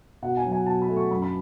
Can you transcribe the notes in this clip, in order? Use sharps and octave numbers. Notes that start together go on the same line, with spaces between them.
B2 F#5
G#5
F#3
G#5
B2 A5
B5
A3
C#6
F#2 B5
B5